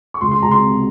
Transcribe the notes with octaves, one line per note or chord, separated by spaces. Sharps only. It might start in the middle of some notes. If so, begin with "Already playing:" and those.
C#6
C#2 C6
C6
C#2 A#5
C6
C3